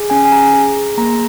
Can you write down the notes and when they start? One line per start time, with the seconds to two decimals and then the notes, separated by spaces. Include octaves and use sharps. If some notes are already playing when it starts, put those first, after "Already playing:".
Already playing: G#4
0.10 C#4 G#5
0.25 G#5
0.32 G#4 A#5
0.54 G#4
0.76 G#4
0.98 A#3 A#5